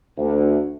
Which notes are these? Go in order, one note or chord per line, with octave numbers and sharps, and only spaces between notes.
D2